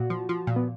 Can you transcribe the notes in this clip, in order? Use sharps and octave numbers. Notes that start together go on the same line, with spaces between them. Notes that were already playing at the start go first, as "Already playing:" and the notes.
Already playing: A#2 F#4
F3
F3
A#2
B3